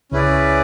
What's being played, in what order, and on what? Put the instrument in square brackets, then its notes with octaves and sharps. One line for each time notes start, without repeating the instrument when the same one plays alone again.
[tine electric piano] C#2 C#3 [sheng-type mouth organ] C#4 E4 G#4 B4 D5